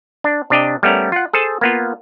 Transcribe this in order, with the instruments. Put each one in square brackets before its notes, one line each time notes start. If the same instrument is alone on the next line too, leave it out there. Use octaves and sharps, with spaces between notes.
[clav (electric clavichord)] D4
C3 D4 G4 D#5
G3 A3 B3 C#4 A#4
F4 F#5
G#4 A4 C5 A5
A#3 B3 F4